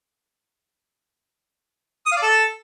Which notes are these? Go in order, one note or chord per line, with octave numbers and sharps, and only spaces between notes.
D#6
F5
D5
A4